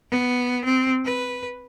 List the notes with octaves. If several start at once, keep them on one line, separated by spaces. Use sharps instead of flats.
B3
C4
B4